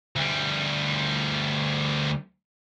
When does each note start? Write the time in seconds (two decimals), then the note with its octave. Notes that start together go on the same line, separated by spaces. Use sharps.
0.16 D2 G3